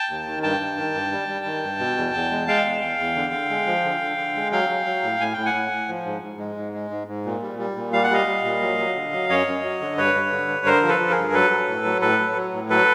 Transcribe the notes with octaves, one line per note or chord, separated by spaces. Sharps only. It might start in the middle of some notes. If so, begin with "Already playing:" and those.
Already playing: G5 A5
D#2
D#3
G2 G5 A5
G2
D#3
G2
G3
G3
D#3
G2
B2
E2
E2
G#3
G#3 F5 G5
E2
E2
E2
D3
D3
G#3
F3
D3
D3
D3
G#3
F#3 F5 G5
F#3
F#3
A2
A2 G#5
A2 G5
F#5 G#5
A2
A2
F3
G#2
G#2
G#3
G#2
G#3
G#2
G#2
A#2
G3
G3
A#2
G3 F5
F#5
G3 D#5 F5
G3
A#2
F#3
F#3
D3
F#3
F#2 C#5 D#5
F#2
F#3
D3
G2 B4 C#5
G2
D3
G2
D3 A#4 C5
F3
A4 B4
F3
G#4 A#4
G2
F#3 A4 B4
F#3
A2
F#3
A2 A4 B4
F#3
F#3
A2
F#3 A4 B4